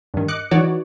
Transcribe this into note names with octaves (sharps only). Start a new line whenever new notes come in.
G2 D#3
D#5 D6 F#6 C#7
E3 D#4 F#4 C#5 D5